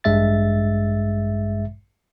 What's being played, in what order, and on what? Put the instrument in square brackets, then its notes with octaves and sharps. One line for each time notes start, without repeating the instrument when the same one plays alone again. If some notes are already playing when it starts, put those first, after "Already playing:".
[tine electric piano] A1 G2 G#3 E5 A6